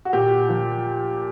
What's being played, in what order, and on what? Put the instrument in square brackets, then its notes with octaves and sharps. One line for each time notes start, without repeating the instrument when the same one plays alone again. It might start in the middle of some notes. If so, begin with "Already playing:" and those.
[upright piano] F#4
A#2 G4
F3